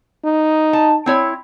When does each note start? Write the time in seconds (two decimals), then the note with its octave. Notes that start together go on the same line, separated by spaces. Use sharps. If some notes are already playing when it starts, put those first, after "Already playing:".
0.24 D#4
0.73 A5
1.06 C4 E4 C#5